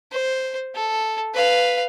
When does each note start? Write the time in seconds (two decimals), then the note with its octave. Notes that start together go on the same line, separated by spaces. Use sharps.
0.12 C5
0.75 A4
1.34 B4 F5